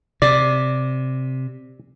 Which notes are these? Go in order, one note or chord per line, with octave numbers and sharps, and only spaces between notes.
C3 D5